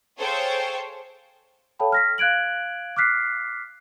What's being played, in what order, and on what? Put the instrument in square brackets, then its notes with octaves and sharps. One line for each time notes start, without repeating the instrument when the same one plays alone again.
[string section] G#4 A4 C5 C#5 F5 G5
[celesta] A4 C#5 F5 G5 A5 B5
F6 A#6 B6
F5 F#6 G#6 D7 F#7
D6 F6 F#6 B6 C7